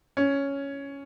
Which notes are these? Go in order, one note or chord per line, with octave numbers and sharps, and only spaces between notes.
C#4